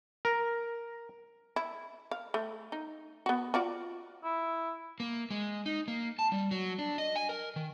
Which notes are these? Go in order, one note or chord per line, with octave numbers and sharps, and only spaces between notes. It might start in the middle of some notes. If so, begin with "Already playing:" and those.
A#4
E4
F5
A3
D#4
B3 F#4
F4 F#4 D5
E4
A#3
G#3
D#4
A#3
A5
G3
F#3
D4
D#5
G#5
A#4
D#3